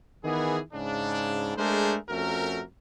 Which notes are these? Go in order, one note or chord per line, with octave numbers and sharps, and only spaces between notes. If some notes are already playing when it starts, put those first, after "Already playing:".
D#3 E3 B3 G#4
G#2 C#3 D4
G#3 A3 D4 G#4 A#4 C5
F2 A3 C#4 F#4 A#4